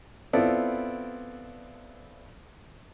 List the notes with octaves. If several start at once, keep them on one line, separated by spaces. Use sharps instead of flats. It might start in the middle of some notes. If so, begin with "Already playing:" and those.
B3 C4 E4 F4 A4 D5